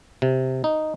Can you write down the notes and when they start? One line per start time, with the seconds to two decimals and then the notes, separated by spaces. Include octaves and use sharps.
0.22 C3
0.64 D#4